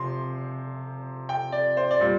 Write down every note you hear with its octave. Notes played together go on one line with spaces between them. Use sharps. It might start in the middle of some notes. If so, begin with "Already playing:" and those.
Already playing: C3 F3 C6
G5
D5
C5
D5
A#2 G3